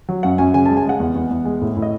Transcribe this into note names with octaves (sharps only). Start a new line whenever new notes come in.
F#3
F#2 F#5
F#2 G#5
C#3 G#5
A5
G#3
G#5
G#3 F#5
E2
E2
E2
G#3
A2
A2
D#5